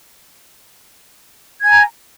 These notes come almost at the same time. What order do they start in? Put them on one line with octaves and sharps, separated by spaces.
G#6 G#5 A#5